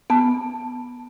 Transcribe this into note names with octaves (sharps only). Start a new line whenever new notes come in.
B3 A5